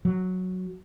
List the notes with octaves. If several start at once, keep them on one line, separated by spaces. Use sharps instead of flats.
F#3